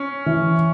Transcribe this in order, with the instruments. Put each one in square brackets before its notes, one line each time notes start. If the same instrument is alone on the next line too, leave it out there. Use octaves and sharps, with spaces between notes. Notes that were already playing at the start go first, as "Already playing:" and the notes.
Already playing: [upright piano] C#4
[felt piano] E3